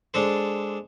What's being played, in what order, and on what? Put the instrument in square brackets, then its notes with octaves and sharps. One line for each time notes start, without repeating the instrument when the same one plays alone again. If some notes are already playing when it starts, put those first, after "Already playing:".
[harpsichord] G#3 D4 A4 C5